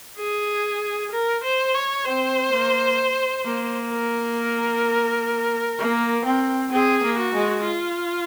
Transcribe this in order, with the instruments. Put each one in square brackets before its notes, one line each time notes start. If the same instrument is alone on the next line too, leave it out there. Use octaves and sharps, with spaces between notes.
[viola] G#4
A#4
C5
C#5
[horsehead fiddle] C4 [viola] C5
[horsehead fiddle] A#3
A#3
[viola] A#4
[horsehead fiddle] A#3
C4
[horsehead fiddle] C4 [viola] G#4
[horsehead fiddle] A#3
[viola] F#4
[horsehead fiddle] G#3
[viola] F4